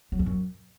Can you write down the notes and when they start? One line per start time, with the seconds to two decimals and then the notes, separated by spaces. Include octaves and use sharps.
0.12 F#3
0.19 E2
0.26 F#2